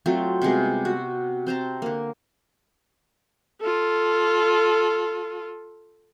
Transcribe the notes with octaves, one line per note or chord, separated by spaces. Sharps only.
F#3 A3 C4 F4
C3 G3 G#3 B3
F#4
C4 C5 A5 A#5
D3 A#3
F4 A4